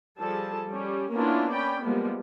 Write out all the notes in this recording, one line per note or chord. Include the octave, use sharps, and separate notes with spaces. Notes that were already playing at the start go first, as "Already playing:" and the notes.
F3 G3 G#4 A4 A5
G3 C#4
A#3 B3 C#4 D4 E4 F4
C#4 D5 G5 B5
F3 G3 G#3 A#3 B3